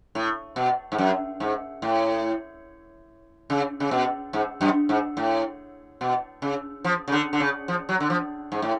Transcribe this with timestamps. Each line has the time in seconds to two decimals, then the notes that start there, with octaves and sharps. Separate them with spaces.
0.15 A2
0.56 B2
0.92 G#2
0.98 F#2
1.40 G#2
1.82 A2
3.50 C#3
3.80 C#3
3.91 B2
4.33 G#2
4.61 F#2
4.89 G#2
5.17 A2
6.01 B2
6.42 C#3
6.84 F3
7.08 C#3
7.12 D3
7.33 D3
7.40 C#3
7.68 F3
7.89 F#3
8.00 D3
8.10 F3
8.52 G#2
8.62 A2